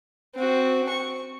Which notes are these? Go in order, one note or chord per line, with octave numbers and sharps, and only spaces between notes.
C4 F#4
C#6